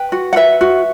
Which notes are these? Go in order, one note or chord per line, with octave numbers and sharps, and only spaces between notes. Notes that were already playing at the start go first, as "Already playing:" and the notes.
Already playing: B4 G5
F#4
F#5
B4 E5
F#4